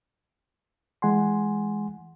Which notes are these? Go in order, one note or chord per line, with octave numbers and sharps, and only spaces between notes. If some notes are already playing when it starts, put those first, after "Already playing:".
E3 G#3 F#5 G#5 C6